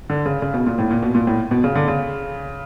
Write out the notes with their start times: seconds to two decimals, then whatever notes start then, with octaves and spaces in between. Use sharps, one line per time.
0.10 D3
0.26 C#3
0.42 C#3
0.54 B2
0.66 A#2
0.78 A2
0.91 A#2
1.03 B2
1.15 A#2
1.27 A2
1.51 B2
1.64 C#3
1.75 D3
1.88 C#3